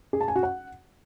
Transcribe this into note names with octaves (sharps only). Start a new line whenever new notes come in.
G#4
A5
G#5
F#4
F#5